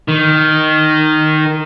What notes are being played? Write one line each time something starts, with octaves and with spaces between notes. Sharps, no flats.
D#3